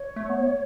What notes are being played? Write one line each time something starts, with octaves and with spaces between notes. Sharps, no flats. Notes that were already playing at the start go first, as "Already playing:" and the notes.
Already playing: C#5
A3
B3
A3